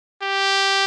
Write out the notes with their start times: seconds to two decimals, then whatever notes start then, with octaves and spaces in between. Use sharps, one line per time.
0.23 G4